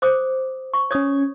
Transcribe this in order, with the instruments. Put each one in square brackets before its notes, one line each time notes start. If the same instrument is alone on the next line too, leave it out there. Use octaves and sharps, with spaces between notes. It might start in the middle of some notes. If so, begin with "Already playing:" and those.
[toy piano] C5 D6 D#6
C#6
[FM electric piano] C#4 G#6 [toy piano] C#5 D#6